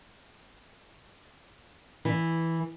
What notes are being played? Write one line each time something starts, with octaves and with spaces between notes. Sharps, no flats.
E3